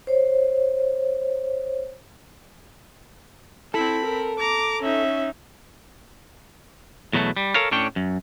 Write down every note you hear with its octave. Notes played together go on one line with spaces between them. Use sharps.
C5 C#5
C4 E4 A4 B5
A#4
A#5 D6
C#4 D#4 E5
E2 B2 F#3 A3
G3
A4 A#4 C#5 F5
A2 C#4 D4 C#5 G5
F#2